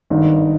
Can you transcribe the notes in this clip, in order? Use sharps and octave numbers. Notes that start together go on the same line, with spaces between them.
G#1 G2 D#3 D#4